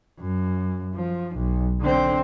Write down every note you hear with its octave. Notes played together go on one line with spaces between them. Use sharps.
F#2
F3
B1
D3 C4